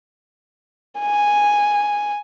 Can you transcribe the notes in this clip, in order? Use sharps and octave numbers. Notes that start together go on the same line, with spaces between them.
G#5